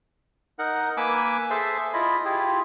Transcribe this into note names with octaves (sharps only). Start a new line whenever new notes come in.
D#4 A#4 F#5
A#3 B4 G#5 D6 E6
G#4 A4 C5 E5 A5
E4 F4 D#5 B5
E4 F4 G4 G#4